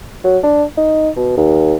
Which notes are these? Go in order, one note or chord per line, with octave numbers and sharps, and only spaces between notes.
F#3
D4
D#4
B2
D#2